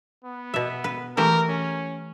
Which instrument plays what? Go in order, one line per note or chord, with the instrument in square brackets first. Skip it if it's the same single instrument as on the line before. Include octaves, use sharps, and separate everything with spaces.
[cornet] B3
[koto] B2 E5
B4
[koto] E3 A3 G4 [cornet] A#4
[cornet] C#4